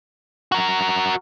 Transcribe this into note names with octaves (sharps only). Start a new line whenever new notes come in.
F#4 A#4